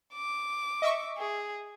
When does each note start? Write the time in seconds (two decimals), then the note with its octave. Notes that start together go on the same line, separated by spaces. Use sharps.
0.14 D6
0.82 D#5 E5 C#6
1.18 G#4